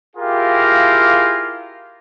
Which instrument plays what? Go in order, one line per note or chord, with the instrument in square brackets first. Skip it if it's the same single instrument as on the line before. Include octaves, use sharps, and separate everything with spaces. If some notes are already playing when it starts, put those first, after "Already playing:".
[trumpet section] E4 F4 G4 G#4 A#4 F5